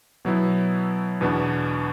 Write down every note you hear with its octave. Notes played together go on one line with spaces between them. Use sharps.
B2 F#3 B3 E4
E2 B2 B3 D4